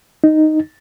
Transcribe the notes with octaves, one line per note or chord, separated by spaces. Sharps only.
D#4